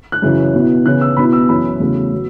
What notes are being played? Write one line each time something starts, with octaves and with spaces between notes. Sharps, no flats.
F#6
F#2 C#3 E3
B2 B3 E4
C#3 E3 B3 E4 F#6
E6
B2 B3 E4 B5
E6
F#2 E3 C#4 E4 B5
E2 C#3 F#3 A3 C#4
F#3 B3